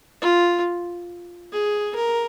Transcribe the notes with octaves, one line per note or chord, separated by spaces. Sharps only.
F4
G#4
A#4